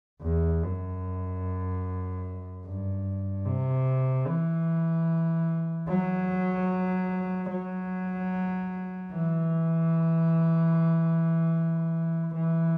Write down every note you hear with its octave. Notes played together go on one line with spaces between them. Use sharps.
E2
F#2
G2
C3
E3
F#3
F#3
E3
E3